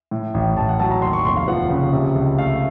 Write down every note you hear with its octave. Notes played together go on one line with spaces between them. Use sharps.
A2
A1
A1 A5
F#5
F#3 A5
A#5
D#2 C6
C#6
F1 C6
F5
F3 F#5
C#3
C3
C#2
A3 F5